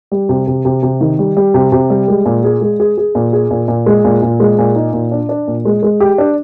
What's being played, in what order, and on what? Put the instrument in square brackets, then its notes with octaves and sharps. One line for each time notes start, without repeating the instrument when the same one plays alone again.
[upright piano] G3
C3
C3
C3
C3
D#3
G3
G3
C3
C3
G3
G#3
A#2
G#4
G#3
G#4
G#4
A#2
G#4
A#2
A#2
G#3
A#2
A#2
G#3
A#2
D#4
A#2
D4
D4
A#2
G#3
G#3
G4
D4